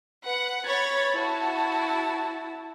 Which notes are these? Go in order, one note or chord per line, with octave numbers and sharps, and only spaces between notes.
B4 F#5
C#5 B5 G#6 A6
E4 F#4 A5